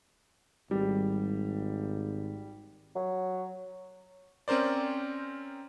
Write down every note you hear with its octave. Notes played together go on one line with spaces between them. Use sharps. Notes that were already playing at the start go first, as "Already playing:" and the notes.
G#1 G3
F#3
C4 C#4 A#4 C5 D5